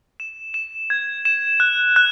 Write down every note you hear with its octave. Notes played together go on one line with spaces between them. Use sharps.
E7
E7
G#6
E7
F#6
F#6